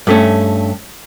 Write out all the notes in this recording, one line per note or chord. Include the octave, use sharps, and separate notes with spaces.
G2 A3 C#4